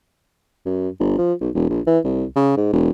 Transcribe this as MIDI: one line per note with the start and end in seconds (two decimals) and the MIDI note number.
0.66 0.89 42
1.00 1.15 31
1.18 1.33 53
1.41 1.49 35
1.55 1.69 28
1.69 1.80 34
1.87 1.99 52
2.04 2.25 36
2.36 2.53 49
2.57 2.68 44
2.73 2.90 28